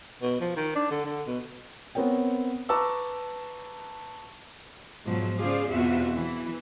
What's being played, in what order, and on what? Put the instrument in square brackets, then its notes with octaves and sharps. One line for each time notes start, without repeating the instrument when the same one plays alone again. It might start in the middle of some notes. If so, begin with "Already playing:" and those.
[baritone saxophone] B2
F3
D#3
D4
D3
D3
B2
[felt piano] B3 C4 A#4 C#5 G5
B4 A5 A#5 C#6 D6 E6
[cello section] G#2 B2 F3 F#3
C#3 F4 G#4 C5 D5 F5
E2 B2 C4 F4 F#4 E5
E3